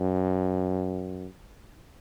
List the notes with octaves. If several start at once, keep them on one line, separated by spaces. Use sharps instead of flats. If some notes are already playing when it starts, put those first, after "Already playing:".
Already playing: F#2